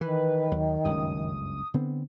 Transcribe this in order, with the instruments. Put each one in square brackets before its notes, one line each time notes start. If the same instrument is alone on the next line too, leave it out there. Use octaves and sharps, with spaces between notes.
[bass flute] D#3 [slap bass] E3 [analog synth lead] B4
[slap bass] D#2 F#3
[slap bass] F#1 C#2 G2 [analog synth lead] D#6
[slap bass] D3 B3 C4